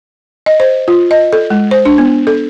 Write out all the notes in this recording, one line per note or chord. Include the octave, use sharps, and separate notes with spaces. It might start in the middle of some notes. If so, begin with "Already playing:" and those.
D#5
C5
F4
D#5
A4
G#3
C5
D4
B3
A4